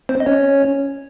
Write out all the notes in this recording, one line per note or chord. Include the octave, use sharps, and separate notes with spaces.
C4 C5
D#5
C#4 C#5